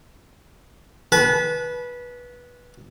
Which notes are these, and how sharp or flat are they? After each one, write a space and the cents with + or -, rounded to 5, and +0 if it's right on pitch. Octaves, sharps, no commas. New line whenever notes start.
B4 -15 A5 -40